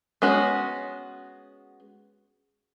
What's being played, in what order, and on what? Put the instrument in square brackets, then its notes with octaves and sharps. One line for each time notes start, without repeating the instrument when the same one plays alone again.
[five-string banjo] G#3 B3 C#4 F#4